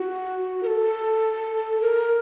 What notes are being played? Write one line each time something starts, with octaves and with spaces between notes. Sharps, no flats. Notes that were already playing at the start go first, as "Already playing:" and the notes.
Already playing: F#4
A#4
A4
A#4